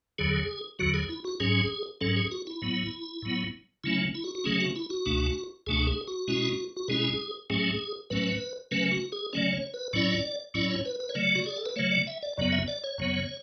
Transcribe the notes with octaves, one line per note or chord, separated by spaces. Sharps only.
E2 D3 F#3 G#4
E2 D3 F#3 F#4
G#4
E4
F#4
G#2 F#3 C#4 G#4
G#2 F#3 C#4 A4
G#4
F#4
E4
A2 F#3 B3
A2 F#3 B3
C#3 F#3 A3 C#4 E4
E4
F#4
F#4
C#3 F#3 A3 C#4 G#4
F#4
E4
F#4
C#2 B2 A3 D4
C#2 B2 A3 D4 G#4
G#4
F#4
B2 G#3 C#4 E4
F#4
B2 G#3 C#4 E4 G#4
A2 F#3 A3 C#4 G#4
A2 F#3 A3 C#4 B4
C#3 F#3 A3 C#4 B4
F#4
G#4
C#3 F#3 A3 C#4 D5
C#5
B4
A2 F#3 C#4 E4 D5
A2 F#3 C#4 E4 D5
C#5
B4
B4
C#5
C#3 F#3 A3 D5
F#4
G#4
A4
B4
C#3 F#3 A3 C#5
D5
E5
D5
F#2 C#3 F#3 B3 D5
E5
D5
C#5
F#2 C#3 F#3 B3